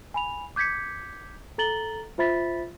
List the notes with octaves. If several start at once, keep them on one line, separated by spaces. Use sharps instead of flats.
G#5 B5 F7
D6 G6 G#6 B6 C#7
A4 A#5 A6 F#7 G7
F4 C5 E5 B5 A6 B6